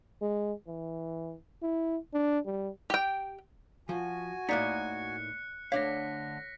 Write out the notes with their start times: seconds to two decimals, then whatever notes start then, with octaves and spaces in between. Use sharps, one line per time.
0.21 G#3
0.67 E3
1.62 E4
2.14 D4
2.46 G3
2.90 G4 G5
3.89 F3 F#4 G#5
4.49 A2 A#3 D#4 D5 A#5 F#6 B6 C#7
5.72 D2 D3 D4 C#5 F5 A#6 B6